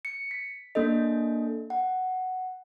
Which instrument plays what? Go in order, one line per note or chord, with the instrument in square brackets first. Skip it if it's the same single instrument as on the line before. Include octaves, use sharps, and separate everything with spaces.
[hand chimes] C#7
B6
A#3 D4 A4 D#5
F#5